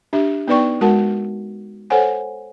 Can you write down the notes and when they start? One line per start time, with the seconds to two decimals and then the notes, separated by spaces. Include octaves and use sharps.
0.13 D4 G4 E5
0.48 B3 D#4 B4 D5 G5 C#6
0.81 G#3 F#4 A#4 F#5 A5
1.90 A4 C5 C#5 F#5 G#5